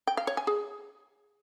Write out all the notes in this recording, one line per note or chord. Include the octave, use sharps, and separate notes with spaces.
G5
F5
C#5
G#5
G#4